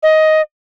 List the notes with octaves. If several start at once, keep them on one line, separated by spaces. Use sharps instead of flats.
D#5